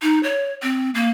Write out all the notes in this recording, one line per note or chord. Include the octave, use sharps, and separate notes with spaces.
D#4
C#5
C4
A#3